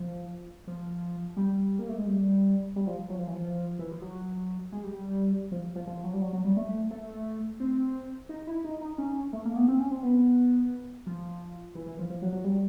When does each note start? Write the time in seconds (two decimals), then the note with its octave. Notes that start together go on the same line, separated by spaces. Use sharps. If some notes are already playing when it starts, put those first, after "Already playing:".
Already playing: F3
0.67 F3
1.37 G3
1.79 A#3
1.89 A3
1.97 G#3
2.06 G3
2.76 G3
2.87 F3
3.10 F#3
3.19 F3
3.28 E3
3.36 F3
3.79 E3
3.91 F3
4.02 F#3
4.72 G#3
4.83 G3
5.52 F3
5.76 F3
5.87 F3
6.04 F#3
6.13 G3
6.21 F#3
6.33 F#3
6.45 G3
6.57 A3
6.91 A3
7.60 C4
8.29 D#4
8.47 E4
8.64 D#4
8.81 D#4
8.98 C#4
9.33 A3
9.45 A#3
9.56 B3
9.68 C4
9.79 C#4
9.91 C4
10.03 B3
11.07 F3
11.75 E3
11.86 E3
11.99 F3
12.10 F3
12.22 F#3
12.32 F#3
12.44 G3